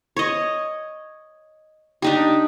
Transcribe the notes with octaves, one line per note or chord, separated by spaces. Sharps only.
C#5 D#5
D4 D#4 G4